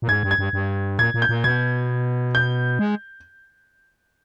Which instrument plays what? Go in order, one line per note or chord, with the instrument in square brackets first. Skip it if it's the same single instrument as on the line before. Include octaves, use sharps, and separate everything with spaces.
[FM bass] A#2
[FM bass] G#2 [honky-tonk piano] G#6
[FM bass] G2
[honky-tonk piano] G#6
[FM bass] G2
G2
[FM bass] A#2 [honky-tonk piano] G#6
[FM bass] A#2
[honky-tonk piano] G6
[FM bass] A#2
[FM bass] B2 [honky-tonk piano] G#6
[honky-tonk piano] G6
[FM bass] G#3